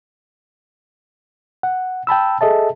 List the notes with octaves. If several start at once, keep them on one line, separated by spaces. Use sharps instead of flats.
F#5
G5 A5 B5 E6
G#4 A4 D#5 E5 A5